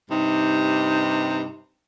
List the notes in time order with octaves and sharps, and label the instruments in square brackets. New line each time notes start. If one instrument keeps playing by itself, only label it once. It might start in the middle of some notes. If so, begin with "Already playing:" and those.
[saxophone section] G2 C3 D#4